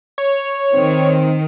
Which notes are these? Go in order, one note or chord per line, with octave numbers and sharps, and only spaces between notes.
C#5
D#3 C4